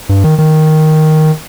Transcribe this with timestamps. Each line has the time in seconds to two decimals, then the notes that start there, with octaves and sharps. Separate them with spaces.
0.09 G2
0.24 D#3
0.38 D#3